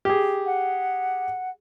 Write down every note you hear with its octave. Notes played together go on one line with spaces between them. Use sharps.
G4 G#4
F#5